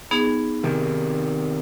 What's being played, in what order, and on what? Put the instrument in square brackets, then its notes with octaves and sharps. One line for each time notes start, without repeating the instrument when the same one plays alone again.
[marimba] B3 D#4 G#4
[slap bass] C3 D#3